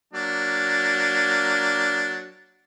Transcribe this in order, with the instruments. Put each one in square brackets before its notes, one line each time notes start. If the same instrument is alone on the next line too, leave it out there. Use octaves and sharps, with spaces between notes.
[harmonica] F#3 A#3 D4